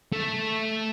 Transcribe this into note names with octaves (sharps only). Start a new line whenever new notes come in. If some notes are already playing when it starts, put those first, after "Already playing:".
A3